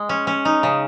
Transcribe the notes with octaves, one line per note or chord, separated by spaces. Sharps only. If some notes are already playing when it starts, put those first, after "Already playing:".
Already playing: G#3
C#4
C#4
D#4
C#3